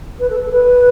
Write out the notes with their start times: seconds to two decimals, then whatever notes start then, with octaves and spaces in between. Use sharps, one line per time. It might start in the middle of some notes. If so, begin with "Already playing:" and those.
0.19 B4
0.29 A4
0.40 A4
0.51 B4